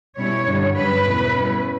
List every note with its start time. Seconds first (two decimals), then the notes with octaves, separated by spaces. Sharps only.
0.18 B2 G3 C#4 E4 C#5
0.46 G2 D3 G3
0.76 G2 F#3 C#4 B4
1.05 E2 B2 A3 E4
1.33 B2 G3 C#4 E4